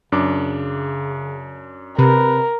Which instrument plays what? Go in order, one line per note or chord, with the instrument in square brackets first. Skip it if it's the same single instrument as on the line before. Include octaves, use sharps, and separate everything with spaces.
[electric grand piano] F#2 D4 D6 [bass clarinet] C#3
[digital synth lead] C3 [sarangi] A#4 [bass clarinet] B4